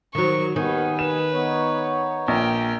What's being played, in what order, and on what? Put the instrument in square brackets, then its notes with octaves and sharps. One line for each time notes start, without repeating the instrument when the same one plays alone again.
[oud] D#3 F#3 [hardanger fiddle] C#6
[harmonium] D#2 B3 G#5 [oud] D#3 [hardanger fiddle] B4
[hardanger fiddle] B4 [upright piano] E7
[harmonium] B3 D#4 C#5
[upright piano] A#1 [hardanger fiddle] A#4 G5